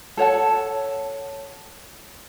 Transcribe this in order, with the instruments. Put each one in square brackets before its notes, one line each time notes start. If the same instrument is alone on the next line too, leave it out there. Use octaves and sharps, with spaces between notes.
[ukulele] A4 C#5 F#5 A5